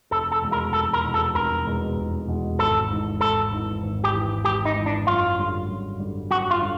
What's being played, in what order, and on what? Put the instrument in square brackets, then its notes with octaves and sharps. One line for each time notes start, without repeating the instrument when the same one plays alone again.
[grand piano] F1 [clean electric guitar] A4
[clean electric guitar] A4
[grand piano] E2 B2 G#3
[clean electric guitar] A#4
[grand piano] F1 [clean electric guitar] A4
[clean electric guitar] A#4
[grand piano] E2 B2 G#3
[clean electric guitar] A4
[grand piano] F1 [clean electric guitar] A#4
[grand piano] E2 B2 G#3
F1
E2 B2 G#3
[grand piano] G#1 [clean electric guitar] A4
[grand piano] G#2 E3
[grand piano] G#1 [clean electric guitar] A4
[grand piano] G#2 E3
G#1
[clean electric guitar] G4
[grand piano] G#2 E3
[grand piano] G#1 [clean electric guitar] G4
[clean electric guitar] D#4
[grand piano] G#2 E3
[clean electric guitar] D4
[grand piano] F#2 [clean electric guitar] F4
[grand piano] D3 G3
F#2
D3 G3
[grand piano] F#2 [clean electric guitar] F#4
[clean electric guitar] F4
[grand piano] D3 G3